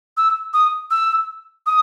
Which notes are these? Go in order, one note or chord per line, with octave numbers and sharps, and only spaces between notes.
E6
D#6
E6
D#6